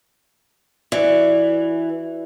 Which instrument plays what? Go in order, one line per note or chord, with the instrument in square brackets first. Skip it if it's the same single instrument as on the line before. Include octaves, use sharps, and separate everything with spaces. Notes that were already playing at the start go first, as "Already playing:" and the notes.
[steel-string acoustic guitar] E3 [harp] F#4 D5